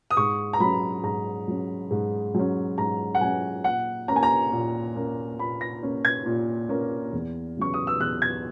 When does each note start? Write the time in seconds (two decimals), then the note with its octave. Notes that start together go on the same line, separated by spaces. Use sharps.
0.11 D#6
0.17 G#2 C#6
0.53 A#5
0.60 F#3 C#4 B5
1.03 G#2 A#5
1.48 F#3 C#4
1.91 G#2
2.35 F#3 C#4
2.78 G#2 A#5
3.15 F#5
3.21 F#3 C#4 G#5
3.64 A#2 F#5
4.08 C#4 A#5
4.11 A#3
4.16 G#5
4.23 A#5
4.52 A#2
4.96 A#3 C#4
5.39 A#2 B5
5.61 A#6
5.82 A#3 C#4
6.05 G#6
6.26 A#2
6.69 A#3 C#4
7.13 E2
7.57 C#3 F#3 C#4 C#6
7.74 D#6
7.87 E6
8.00 E2 F#6
8.22 G#6